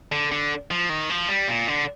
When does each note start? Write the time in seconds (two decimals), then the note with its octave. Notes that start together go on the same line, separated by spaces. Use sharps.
0.12 D3
0.32 D3
0.71 F3
0.89 D#3
1.10 F3
1.28 G3
1.48 A#2
1.68 D3